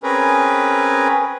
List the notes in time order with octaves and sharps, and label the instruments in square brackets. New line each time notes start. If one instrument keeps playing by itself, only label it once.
[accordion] C4 C#4 G#4 A#4 B4